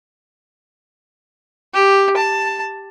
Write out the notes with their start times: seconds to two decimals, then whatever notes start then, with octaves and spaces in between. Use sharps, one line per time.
1.74 G4
2.17 A5